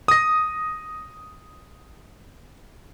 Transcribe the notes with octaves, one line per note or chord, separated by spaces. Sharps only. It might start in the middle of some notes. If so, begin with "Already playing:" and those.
D#6 A#6